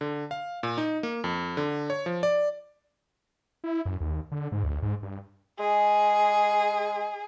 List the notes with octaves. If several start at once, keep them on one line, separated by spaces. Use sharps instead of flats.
D3
F5
A#2
D#4
A#3
F2
D3
C#5
F3
D5
E4
F#2
D#2
D3
G#2
D2
G#2
G2
G#3 G#4